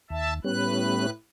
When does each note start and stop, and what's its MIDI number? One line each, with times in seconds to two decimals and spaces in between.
0.10 0.40 39
0.10 0.33 76
0.10 0.33 81
0.44 1.10 45
0.44 1.06 55
0.44 1.06 59
0.44 1.06 61
0.44 1.10 71
0.44 1.10 90